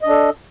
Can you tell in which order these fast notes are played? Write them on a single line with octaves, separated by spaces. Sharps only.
D#5 D4 A4